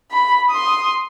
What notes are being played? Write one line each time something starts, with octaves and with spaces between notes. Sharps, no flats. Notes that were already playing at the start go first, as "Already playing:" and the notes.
B5
C6 D#6